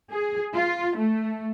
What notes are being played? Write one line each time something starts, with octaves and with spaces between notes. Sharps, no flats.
G#4
F4
A3